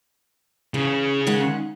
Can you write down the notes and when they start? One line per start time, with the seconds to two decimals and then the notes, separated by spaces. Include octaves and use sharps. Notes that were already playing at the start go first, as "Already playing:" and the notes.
0.74 C#3 E3
1.27 D#3 G#3 F#5